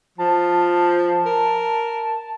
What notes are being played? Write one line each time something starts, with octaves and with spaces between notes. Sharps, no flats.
F3 A5
A#4